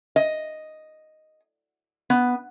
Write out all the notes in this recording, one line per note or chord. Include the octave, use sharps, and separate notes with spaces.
D#5
B3